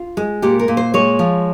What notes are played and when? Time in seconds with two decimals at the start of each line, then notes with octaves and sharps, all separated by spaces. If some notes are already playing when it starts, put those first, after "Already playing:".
Already playing: F4
0.17 G#3
0.42 A#2 G4
0.59 A#4
0.68 A#2
0.77 C5
0.94 G#3 C#5
1.19 F3